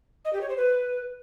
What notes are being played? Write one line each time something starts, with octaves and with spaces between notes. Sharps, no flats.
D#5
G4
C#5
C5
B4